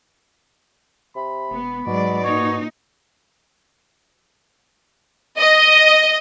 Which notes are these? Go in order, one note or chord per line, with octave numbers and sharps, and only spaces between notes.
C3 B5
E1 B3
G#2 B2 F#3 G#3 D5
A#2 D#4 C#5
D#5